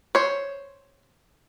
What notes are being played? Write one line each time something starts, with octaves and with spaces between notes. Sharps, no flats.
C5 C#5